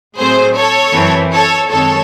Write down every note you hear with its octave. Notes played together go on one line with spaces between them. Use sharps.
A2 F#3 A3 C4 G#4 C5
A4 C#5
F#2 E3 C4
A4 C#5
F#2 D#3 G#3 C4 A4 C#5